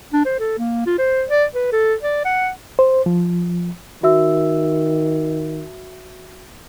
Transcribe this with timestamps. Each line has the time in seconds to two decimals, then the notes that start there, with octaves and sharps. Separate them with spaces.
0.13 D4
0.26 C5
0.40 A4
0.59 A#3
0.87 F4
0.99 C5
1.29 D5
1.55 B4
1.73 A4
2.03 D5
2.25 F#5
2.79 C5
3.06 F3
4.03 D#3 F#4 E5 E6